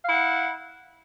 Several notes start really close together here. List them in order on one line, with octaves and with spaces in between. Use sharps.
F5 E4 F#5